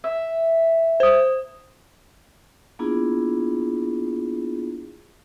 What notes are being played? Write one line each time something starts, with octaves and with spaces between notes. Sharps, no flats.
E5
C5 D#6
A#3 B3 D4 E4 F4 G#4